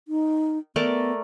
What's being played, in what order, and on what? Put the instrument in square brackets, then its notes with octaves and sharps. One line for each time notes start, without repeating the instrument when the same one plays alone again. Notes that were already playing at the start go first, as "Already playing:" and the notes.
[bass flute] D#4
[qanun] A3 A#4 D5 [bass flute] B3